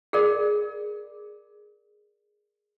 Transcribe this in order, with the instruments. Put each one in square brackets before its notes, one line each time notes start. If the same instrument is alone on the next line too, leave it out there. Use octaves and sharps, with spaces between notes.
[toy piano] G#4 A#4 D5